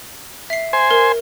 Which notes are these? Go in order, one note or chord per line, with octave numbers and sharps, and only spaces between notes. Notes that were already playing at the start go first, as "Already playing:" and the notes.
E5 C7
C5 G#5
A#4